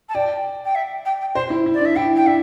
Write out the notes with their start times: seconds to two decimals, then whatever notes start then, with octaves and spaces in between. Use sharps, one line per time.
0.08 A5
0.14 D5 G5
0.64 G5
0.74 E5
1.05 G5
1.20 G5
1.35 C5 C6
1.50 E4
1.66 E4
1.73 D5
1.81 D4
1.85 E5
1.95 E4 G5
2.15 G5
2.26 D4 E5